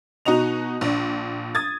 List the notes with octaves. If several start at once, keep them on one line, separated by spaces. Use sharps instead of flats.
B2 D#4 F#4 D#5 F7
A#1 D4
D#6 G#6 A6